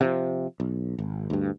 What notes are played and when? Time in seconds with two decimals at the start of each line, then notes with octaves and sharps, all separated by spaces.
0.01 C3 E3 F3
0.60 B1
0.99 G#1
1.30 D2 G2